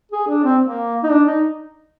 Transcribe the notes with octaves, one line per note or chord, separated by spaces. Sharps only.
G#4
D4
C4
A#3
D#4
D4
D#4